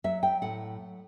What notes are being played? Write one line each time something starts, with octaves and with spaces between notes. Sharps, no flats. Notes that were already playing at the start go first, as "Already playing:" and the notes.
F#3 E5
G5
A2 F#5